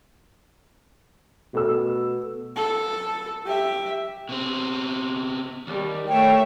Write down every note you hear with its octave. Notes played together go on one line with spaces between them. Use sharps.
B2 A3 A4 E6
A4
G4 E5
B2 C4
D#2 G3
A3 C#5 E5 G5